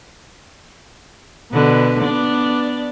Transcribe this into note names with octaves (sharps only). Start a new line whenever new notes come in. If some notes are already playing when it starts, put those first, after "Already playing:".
B2 D3 B4
B3 D4 D5